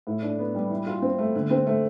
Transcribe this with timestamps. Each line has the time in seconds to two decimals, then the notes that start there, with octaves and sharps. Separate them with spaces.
0.07 A2
0.22 D4
0.38 B3
0.55 G3
0.71 E3
0.87 F4
1.02 C4
1.19 A3
1.35 D3
1.50 C4
1.67 A3